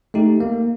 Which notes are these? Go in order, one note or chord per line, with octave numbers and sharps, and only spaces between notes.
A3 D#4 G4
A#3